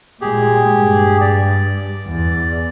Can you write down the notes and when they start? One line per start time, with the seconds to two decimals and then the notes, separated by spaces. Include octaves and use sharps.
0.21 A#2 G#3 G4 G#4
0.72 G2
1.21 D5
2.05 E2